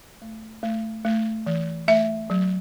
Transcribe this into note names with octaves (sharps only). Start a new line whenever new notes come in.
A3
A3
A3
E3
A3 E5
F#3